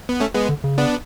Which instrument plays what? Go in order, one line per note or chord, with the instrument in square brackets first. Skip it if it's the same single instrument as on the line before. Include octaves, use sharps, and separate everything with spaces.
[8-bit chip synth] B3
A3 C#4
G#3 B3
[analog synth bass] D3
C#3
[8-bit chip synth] B3 D4